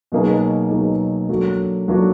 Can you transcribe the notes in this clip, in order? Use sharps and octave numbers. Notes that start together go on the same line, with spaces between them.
B2 F#3 A#3 D#4 G#4
B2 F#3 A#3 D#4 G#4
F#3 A#3 D4 F#4 A4
F#3 A#3 D4 F#4 A4